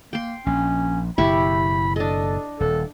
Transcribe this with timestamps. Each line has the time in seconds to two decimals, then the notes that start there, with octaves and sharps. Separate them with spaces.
0.13 A#3 G5 C6
0.46 A#1 C#4
1.18 F#1 B2 E4 G4 B5 C#6
1.96 D4 A4 D#5
2.60 D#1 A4